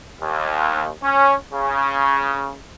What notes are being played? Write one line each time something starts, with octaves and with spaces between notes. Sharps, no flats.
D#2
C#4
C#3